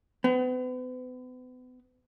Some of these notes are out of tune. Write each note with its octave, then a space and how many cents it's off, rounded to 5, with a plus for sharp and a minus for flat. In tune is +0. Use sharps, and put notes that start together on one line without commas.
B3 +40